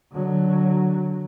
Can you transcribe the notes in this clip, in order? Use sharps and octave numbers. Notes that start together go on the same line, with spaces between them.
D3 F#3